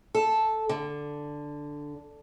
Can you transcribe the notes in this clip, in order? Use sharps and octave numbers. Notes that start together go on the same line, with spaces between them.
A4
D3